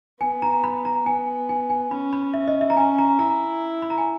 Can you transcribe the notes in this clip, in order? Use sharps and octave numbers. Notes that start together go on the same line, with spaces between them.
B3 G#5
A#5
B5
A#5
B3 G#5
G#5
G#5
C#4 B5
B5
E5
D#5
E5
A#5
C#4 G#5
A#5
E4 A#5
B5
A#5
G#5